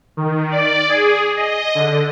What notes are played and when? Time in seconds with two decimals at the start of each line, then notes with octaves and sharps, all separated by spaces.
0.17 D#3
0.51 D5
0.89 G#4
1.37 D#5
1.75 D3